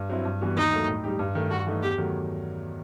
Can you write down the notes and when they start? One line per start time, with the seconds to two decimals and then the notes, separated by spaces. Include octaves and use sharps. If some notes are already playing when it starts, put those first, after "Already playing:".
Already playing: G2
0.10 F#3 C4 E4
0.25 G2
0.41 E3 G3 B3 F#4
0.56 D#2 D#4
0.72 D#3 F#3 A3
0.88 A2
1.04 G3 D#4 G4
1.19 G2
1.35 D#3 A3
1.51 G2 F#4
1.67 E3 A3 D#4
1.82 E2 G4
1.98 D#3 F#3 A3